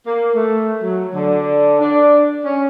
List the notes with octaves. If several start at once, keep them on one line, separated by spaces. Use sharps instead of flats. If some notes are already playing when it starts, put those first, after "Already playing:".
A#3
A3
F#3
D3
D4
C#4